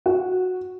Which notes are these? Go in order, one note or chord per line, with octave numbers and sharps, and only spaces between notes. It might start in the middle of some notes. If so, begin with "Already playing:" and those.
F#4